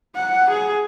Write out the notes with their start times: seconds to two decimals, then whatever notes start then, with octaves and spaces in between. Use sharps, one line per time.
0.15 F#5
0.50 G#4